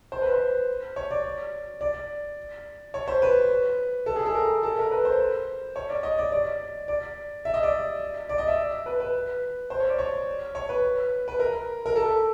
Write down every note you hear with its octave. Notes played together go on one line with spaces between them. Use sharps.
C5
B4
C5
C#5
D5
D5
C#5
C5
B4
A4
G#4
A4
A#4
A4
A#4
B4
C5
C#5
D5
D#5
D5
D5
D5
E5
D#5
D5
D5
D#5
E5
B4
B4
C5
C#5
D5
C#5
C#5
B4
B4
A#4
A#4
A4